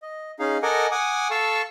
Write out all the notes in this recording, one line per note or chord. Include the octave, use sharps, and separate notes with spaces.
D#5
C#4 D#4 G#4 F5
A4 A#4 D#5 F#5 G#5 D6
F#5 G#5 D6 D#6
A4 F5 A5 C#6 E6